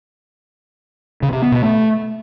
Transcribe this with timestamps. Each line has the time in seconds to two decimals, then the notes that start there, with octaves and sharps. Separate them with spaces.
1.23 C#3
1.32 C3
1.42 B3
1.52 B2
1.62 A3